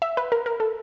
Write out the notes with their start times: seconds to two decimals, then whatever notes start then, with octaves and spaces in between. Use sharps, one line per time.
0.02 E5
0.17 B4
0.32 A#4
0.46 A#4
0.60 A4